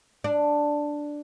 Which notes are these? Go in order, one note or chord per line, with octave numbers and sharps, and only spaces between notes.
D4